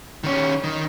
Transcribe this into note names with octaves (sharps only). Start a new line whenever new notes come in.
D#3 C#4
D#3